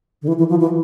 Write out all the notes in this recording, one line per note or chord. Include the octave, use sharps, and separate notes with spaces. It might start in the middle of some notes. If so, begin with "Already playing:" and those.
D3
E3
E3
F3
E3